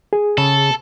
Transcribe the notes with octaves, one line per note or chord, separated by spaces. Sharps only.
G#4
C#3 A4